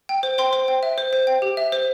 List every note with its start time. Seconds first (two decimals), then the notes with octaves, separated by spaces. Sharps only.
0.09 G5
0.23 C5
0.38 C5 G5 C6
0.53 C5
0.68 G5
0.83 E5
0.98 C5
1.13 C5
1.27 G5
1.42 G4
1.57 E5
1.72 C5